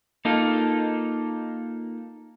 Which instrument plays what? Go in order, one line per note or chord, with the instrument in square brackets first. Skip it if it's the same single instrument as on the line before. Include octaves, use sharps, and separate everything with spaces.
[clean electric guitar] A#3 D#4 F4 A4